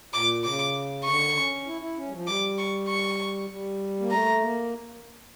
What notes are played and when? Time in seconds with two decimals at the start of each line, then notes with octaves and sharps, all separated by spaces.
0.13 A#2 D6
0.44 C#3 D6
1.05 D3 C#6
1.36 C#4
1.67 E4
1.81 E4
1.97 C#4
2.07 G3
2.12 F3
2.27 G3 D6
2.58 C#6
2.88 C#6
3.50 G3
4.00 A#3
4.11 A3 A#5
4.42 A#3